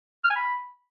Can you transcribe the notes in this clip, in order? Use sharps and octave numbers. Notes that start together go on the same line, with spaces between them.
F6
G#5
B5